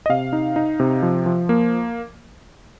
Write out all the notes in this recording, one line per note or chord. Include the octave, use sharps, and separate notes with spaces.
D#5
C3 F5
D#4
D#4
C3
F3
F3
A#3